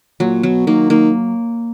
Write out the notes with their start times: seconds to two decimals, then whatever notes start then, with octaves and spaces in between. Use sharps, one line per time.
0.20 A#2 F#3
0.43 B2 F#3
0.67 D#3 A#3
0.90 D#3 A#3